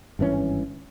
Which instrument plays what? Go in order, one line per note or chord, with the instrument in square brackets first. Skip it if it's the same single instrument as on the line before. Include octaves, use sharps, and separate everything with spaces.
[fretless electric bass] G#1 G2 E3 C#4